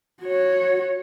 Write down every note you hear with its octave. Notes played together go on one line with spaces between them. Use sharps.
F#4 C#5